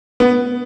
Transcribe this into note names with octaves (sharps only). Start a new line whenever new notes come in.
B3